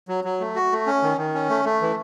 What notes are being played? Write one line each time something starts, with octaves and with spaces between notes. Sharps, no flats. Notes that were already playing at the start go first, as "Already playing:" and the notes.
F#3
F#3
A3
F#4
A3
C#4
D#3
D#3
C#4
A3
A3
E3